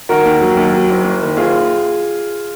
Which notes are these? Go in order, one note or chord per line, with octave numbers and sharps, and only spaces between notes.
D#3 F#4 A#4
D#2
F#3
D#2
F#3
F#1
F#1
D#3
F#1 F4 G#4